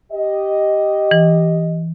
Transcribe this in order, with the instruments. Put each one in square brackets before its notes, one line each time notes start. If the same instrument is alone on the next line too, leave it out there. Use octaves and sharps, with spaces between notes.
[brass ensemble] G4 D#5
[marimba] E3